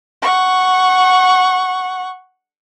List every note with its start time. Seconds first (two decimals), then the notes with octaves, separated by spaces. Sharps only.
0.22 F#5 C#6